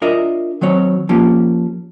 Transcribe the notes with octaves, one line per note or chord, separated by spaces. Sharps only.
D4 F4 A#4 D#5 E5
D#3 F#3 C4 C#5
F3 A#3 C#4 G4